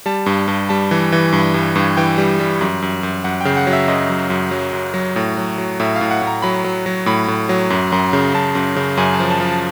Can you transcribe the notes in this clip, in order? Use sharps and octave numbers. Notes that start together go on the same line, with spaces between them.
G3 A5
G2
G2
G3 A5
E3
E3
G2
G2
G2
E3 G5
G3
G3
F#2
F#2
F#2
F#2 F#5
C#3 G5
F#5
F#3
E5
F#2 D#5
F#3
F#2
F#3
F#2
F#3
A2
F#3
F#3
A2 E5
F5
A2
F#5
A2
A#5
F#3 B5
F#3
F#3
A2 B5
A2
F#3
F#2
F#2
C#3
F#2 A5
F#2
C#3
F#2 G#5
A5
F3
A5
F3
A5